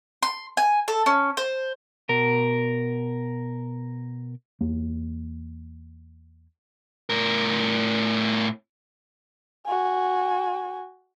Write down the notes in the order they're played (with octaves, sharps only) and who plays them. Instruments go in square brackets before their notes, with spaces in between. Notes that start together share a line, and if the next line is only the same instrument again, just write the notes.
[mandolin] C6
G#5
A4
C#4
C5
[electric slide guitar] B2 A#4
[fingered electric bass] E2 A#3
[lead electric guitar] A2 A#4
[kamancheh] F#4 G#5